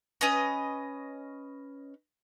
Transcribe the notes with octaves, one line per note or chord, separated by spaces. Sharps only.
C#4 B4 D#5